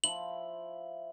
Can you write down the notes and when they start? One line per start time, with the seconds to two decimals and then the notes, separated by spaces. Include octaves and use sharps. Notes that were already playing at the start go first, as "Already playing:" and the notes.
0.04 F3 E4 F#7